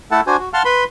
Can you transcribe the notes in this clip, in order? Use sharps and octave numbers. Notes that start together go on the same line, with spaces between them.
A3 E4 A4 F#5 A5
D4 F#4 C5 G#5
F#4
F5 F#5 A5 C6 F6
B4 B5 C6